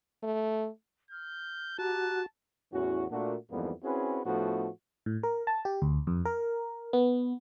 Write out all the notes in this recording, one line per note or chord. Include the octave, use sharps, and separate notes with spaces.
A3
F6 G6
F#4 G4 A5 A#5 F#6
E2 A2 E3 C#4 F#4
A#2 A3 A#3 D4 F#4
F2 G#2 E3 G3 A#3 B3
C4 C#4 E4 F#4 G#4 B4
A2 F3 A3 B3 D4 F#4
A2
A#4
A5
G4
D2
F2
A#4
B3